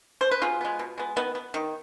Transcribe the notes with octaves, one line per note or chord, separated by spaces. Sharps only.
C5
B4
B2 F4 G#4
G#3 B3
B2
G#3 B3
D#3 B3
B3
D#3